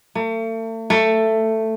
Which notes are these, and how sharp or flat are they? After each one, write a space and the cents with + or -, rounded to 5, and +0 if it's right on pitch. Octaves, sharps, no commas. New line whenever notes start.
A3 +40
A3 +10